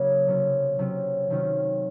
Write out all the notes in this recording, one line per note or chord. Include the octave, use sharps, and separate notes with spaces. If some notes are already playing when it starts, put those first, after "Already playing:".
Already playing: C#3 F#3 A#3 C#4
C3 F#3 C#4
C3 F#3 C#4
C3 D#3 F#3 C#4 F4